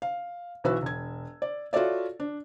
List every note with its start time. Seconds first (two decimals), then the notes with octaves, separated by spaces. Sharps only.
0.02 F5
0.64 B1 E3 F#4 B4 E6
0.82 E1 G#6
1.42 D5
1.73 F4 F#4 A4 C#5 D5 E5
2.20 D4